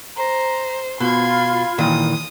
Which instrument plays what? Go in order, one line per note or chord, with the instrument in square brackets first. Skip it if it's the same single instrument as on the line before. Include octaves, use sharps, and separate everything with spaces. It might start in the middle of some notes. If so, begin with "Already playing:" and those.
[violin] C5 [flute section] A#5
[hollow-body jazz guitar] B2 [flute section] F4 B5 [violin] C6 G#6
[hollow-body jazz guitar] A#2 D#3 E3 [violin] D#6